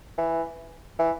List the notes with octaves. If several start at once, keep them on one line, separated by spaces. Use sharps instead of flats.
E3
E3